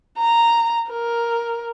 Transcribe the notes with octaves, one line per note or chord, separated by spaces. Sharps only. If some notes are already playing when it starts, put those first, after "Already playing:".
A#5
A#4